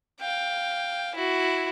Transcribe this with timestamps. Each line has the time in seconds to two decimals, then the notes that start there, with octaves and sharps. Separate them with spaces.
0.21 F5 G5
1.15 E4 F#4